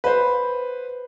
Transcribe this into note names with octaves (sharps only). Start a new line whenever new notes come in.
B4 C5